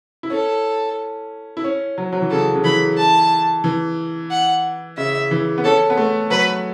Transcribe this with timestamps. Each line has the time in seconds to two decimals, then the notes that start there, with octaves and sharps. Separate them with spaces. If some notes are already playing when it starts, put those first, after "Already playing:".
0.23 E4
0.30 C#4 A4
1.57 E4
1.64 C#4
1.98 F#3
2.13 F#3
2.22 E3
2.31 C#3 A4
2.55 C#3
2.64 E3 B5
2.97 A5
3.64 E3
4.31 F#5
4.98 C#3 E5
5.31 E3
5.58 B3
5.64 C#4 A4
5.90 B3
5.97 A3
6.30 F#3 B4